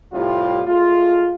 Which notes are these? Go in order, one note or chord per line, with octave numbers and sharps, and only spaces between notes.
A2 C3 G3 E4 F4
G#3 A3 F4